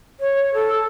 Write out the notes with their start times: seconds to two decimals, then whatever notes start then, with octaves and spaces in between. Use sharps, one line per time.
0.20 C#5
0.54 A4